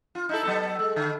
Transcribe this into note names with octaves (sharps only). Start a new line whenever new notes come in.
F4
D#4 E4 A4
F#3 B3 A4
G#3
D3